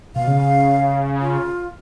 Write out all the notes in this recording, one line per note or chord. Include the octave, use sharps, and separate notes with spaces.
B2 F5
C#3
F4